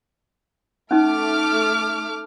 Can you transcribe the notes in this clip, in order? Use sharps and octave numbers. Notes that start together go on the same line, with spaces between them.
A3 C#4 D#4 D6 F6